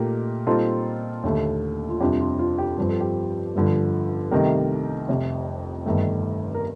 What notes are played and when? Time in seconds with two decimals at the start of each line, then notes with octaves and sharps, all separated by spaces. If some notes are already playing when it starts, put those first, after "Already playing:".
Already playing: A#2 A3 D#4 G4 A#4
0.46 A#2 G3 C4 D#4 F4 A4
1.23 D#2 D3 A3
1.89 F4
2.00 F2 C3 G3 D4 F4 G4
2.20 F4
2.39 F4
2.58 G4
2.77 G2 F3 C4 G4
2.89 A4
3.00 G4
3.55 G1 G2 D3 F3
4.31 C2 C3 D#3 A3 D#4 G4 A#4
5.09 F1 F2 C3
5.86 G1 G2 D#3 A3
6.54 A#4